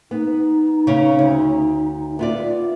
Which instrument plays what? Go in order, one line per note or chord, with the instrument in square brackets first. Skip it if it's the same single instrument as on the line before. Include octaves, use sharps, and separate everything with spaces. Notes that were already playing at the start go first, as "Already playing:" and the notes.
[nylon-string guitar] B3 [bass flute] D#4
[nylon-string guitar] C#3 C#4
D2
[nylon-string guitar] B3 F4 D5 [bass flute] E5